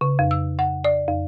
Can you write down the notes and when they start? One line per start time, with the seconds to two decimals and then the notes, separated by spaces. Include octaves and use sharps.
0.01 C#3
0.19 F2
0.31 E6
0.59 F#5
0.85 D5
1.08 F2